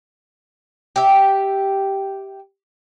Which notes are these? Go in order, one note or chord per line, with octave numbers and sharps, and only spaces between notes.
G4 E5